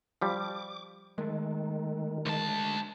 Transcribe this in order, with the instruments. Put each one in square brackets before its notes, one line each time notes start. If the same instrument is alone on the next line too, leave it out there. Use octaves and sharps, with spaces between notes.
[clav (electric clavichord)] F3 G3 [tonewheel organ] D6
[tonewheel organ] D#3 [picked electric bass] G#3 A3
[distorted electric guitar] D2 A5 [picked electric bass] G#3